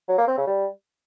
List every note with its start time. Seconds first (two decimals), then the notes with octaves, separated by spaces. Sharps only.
0.09 F#3
0.18 A#3
0.28 C4
0.38 C#3
0.47 G3